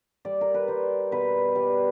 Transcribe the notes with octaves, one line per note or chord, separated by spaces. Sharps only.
G3 D5
A#4
B4
G3 C5
B2 B4
G3